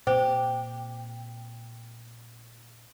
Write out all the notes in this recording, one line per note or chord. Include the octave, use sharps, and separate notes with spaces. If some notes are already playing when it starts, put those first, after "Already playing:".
A#2 C4 G4 C5